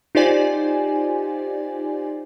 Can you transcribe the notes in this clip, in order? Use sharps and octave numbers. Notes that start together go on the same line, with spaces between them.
D#4 F4 G4 C5 D5 G#5